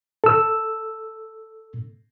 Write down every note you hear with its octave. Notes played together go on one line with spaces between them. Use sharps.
A4 E6